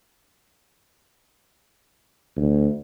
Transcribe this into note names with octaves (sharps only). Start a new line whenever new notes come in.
D2